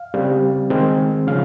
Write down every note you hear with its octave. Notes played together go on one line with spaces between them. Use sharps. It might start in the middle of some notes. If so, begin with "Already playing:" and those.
Already playing: F5
C#3 G3 C4
D#3 G#3 C4
C#3 F3 F5